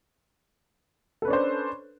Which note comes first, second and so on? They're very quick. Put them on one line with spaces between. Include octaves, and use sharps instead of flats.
A4 B4 C#4 D4 C5